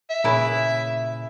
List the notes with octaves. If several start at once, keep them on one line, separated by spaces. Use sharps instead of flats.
E5
A#2 C#3 E4 B4 C#5